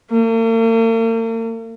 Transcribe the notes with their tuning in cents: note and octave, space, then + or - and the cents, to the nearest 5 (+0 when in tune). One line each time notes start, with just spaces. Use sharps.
A#3 -45